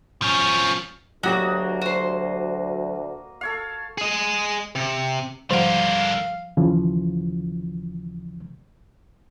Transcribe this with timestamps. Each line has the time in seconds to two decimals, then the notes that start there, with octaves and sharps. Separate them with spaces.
0.22 F3 C#4
1.23 D2 F#3 A#3 F#4 G4 D#5
1.82 F#4 C5
3.41 A4 C#5 F5
3.98 G#4 D#5
4.75 C3
5.51 C#2 G#2 D3 F3 G3 A#4 F5 F#5
6.57 D#2 C#3 E3 F3